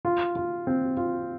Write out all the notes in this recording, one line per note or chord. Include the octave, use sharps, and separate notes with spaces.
F4
F4
C4
F4